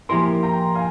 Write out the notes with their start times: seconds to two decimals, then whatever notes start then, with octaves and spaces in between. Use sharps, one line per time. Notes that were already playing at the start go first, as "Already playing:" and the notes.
0.09 F3 A#3 E4 G4 A#4 G#5 C6
0.43 G5 A#5
0.75 F5 G#5